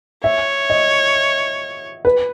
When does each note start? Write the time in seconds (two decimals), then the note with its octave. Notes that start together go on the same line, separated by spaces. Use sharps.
0.24 C#5 E5
0.70 D#5
2.05 B4